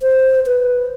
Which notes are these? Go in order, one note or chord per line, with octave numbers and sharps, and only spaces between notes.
C5
B4